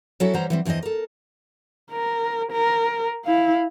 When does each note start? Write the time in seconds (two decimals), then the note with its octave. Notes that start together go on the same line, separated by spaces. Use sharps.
0.20 F#3 C#4 E4 F#4 A4
0.34 E3 G3 C5 C#5 F#5 A#5
0.50 E3 G3 C4
0.65 E2 E3 C4 C5 D#5
0.83 A4 A#4
1.91 A#4
2.51 A#4
3.25 E4 F5